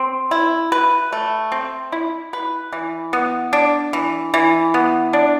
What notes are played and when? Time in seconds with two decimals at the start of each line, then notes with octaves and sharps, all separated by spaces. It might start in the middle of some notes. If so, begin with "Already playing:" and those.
Already playing: C4
0.31 E4
0.72 B4
1.12 A3
1.52 C4
1.92 E4
2.33 B4
2.73 E3
3.13 B3
3.53 D4
3.93 E3
4.34 E3
4.74 B3
5.13 D4